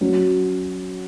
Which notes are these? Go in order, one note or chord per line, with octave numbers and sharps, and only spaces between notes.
F#3 C#4 F#4